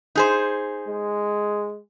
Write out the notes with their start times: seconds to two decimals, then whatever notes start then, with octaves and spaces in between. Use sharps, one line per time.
0.15 D#4 G#4 C5
0.87 G#3